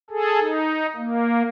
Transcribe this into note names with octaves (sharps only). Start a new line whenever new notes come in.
G#4 A4
D#4
A#3